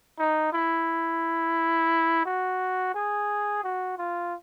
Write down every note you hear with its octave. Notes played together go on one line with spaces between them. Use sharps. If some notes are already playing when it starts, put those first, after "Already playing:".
D#4
E4
F#4
G#4
F#4
F4